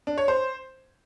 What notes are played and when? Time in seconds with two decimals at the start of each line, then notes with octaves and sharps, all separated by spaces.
0.07 D4
0.18 C#5
0.28 C5